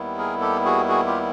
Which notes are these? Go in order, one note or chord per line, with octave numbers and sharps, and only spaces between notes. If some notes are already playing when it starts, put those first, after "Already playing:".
Already playing: D#2 D#3 G3 B3 E4
G#4 A#4
G4 A4
F#4 G#4
F#4 G#4
F4 G4